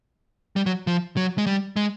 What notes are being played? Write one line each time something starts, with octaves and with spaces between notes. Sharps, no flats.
G3
F#3
F3
F#3
G#3
G3
G#3